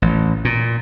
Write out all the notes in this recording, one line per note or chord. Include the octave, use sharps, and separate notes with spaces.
A1
A#2